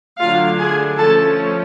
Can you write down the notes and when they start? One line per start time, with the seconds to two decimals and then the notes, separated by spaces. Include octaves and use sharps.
0.19 D3 F#3 A3 D4 F4 F5
0.58 G#4 G#5
0.97 F3 A3 C#4 A4 A5